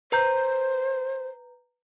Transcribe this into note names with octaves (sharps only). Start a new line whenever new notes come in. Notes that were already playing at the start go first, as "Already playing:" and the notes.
B4 C5 A#5 G6